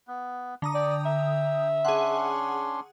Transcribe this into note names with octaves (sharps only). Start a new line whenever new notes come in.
B3
D3 A#5 D#6
D5 G5
E5
C#4 D4 G#4 F#5 C6